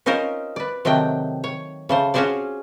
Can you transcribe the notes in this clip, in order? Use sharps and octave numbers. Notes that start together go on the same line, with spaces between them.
C#4 D#4 F4 A#4 C5
B4 D5
C3 D#3 F#3 A3 G5
C#5
C#3 A3 C5
C#4 F4 F#4 G#4 C5 D5